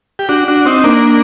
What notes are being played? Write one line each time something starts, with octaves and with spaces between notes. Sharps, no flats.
G4
D4 F#4
D4 F#4
C4 D#4
A#3 D4